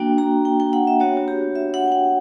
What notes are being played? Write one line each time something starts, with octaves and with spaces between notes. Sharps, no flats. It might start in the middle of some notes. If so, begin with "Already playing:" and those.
Already playing: A#3 D4 F#4 G5
A#5
G5
G5
F#5
E5
B3 D4 F#4 C#5
F#4
G4
E5
F#5
G5
F#5